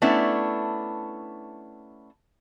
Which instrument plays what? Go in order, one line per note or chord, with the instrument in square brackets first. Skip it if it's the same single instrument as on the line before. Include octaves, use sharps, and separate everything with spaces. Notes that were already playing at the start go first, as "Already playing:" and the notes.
[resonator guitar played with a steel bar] A3 B3 C#4 D4 E4